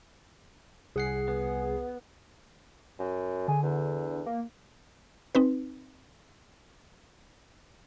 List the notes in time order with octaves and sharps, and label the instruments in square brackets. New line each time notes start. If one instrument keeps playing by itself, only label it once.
[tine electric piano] C2 F#5 C7 [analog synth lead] G#4
[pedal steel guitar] B3
[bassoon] F#2
[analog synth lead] D3 [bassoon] G#4
[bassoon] E2
[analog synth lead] A#3
[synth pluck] C4 D#4 B4